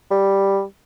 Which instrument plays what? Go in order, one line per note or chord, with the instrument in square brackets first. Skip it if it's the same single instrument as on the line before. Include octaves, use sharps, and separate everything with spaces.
[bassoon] G3